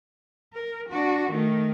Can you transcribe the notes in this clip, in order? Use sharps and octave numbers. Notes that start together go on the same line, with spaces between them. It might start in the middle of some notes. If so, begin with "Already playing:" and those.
A#4
D4 F#4
D#3 A3